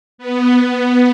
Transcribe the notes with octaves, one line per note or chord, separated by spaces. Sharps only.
B3